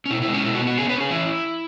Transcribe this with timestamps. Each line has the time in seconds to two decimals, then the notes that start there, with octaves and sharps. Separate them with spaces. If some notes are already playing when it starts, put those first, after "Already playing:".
0.06 C#4
0.10 B2 E4
0.22 E4
0.28 G#3
0.34 C#4
0.44 B2 E4
0.55 F#4
0.61 B3
0.67 F#4
0.78 C#4 G#4
0.89 C#4 B4
1.00 G#4
1.10 E3 E4